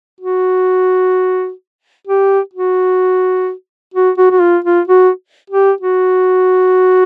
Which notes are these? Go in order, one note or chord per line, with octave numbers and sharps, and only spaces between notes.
F#4
G4
F#4
F#4
F#4
F#4
F4
F4
F#4
G4
F#4